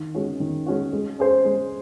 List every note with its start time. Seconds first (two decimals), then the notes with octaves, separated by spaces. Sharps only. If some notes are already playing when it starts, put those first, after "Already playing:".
Already playing: D#3
0.14 G#3 C#4 F#4
0.40 D#3
0.66 G#3 C#4 F#4
0.93 G#3
1.19 C#4 G#4 C5
1.45 G#3